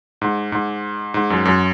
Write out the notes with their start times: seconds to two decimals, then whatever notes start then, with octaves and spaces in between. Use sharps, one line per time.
0.21 G#2
0.52 G#2
1.14 G#2
1.30 F#2
1.45 F#2